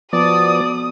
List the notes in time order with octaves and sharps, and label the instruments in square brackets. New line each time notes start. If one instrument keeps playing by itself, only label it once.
[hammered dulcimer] B2 A4 A5 [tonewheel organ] F3 B3 [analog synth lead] D5 [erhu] D#6